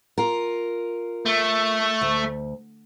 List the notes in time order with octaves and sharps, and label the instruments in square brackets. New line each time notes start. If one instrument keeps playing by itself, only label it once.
[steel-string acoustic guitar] F4 A#4
[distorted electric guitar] A3
[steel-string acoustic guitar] D2